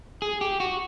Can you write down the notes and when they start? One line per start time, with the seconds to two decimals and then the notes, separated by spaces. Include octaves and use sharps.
0.22 G#4
0.41 G4
0.60 F#4